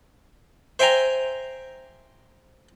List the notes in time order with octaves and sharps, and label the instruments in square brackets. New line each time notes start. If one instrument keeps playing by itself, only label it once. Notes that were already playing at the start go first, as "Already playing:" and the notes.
[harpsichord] C5 E5 G5 G#5 A#5